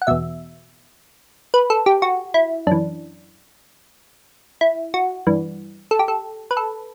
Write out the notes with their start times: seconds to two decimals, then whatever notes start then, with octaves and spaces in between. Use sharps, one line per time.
0.02 F#5
0.07 E2 B2 E5
1.54 B4
1.70 A4
1.86 G4
2.02 F#4
2.34 E4
2.67 F#2 E3 D4
4.61 E4
4.94 F#4
5.27 G2 E3
5.91 A4
5.99 G4
6.08 A4
6.51 B4
6.57 A4